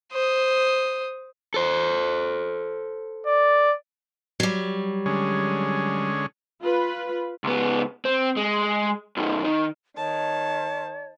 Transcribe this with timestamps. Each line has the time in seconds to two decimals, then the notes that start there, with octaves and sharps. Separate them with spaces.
0.12 C5 D#6
1.54 A4 C5
3.26 D5
4.40 F#3 G3
5.06 D3 G#3 C#4
6.61 F4 B4
7.44 C#2 B3
8.05 C4
8.37 G#3
9.17 F#2 D#3
9.44 D#3
9.97 D#3 C#5 A5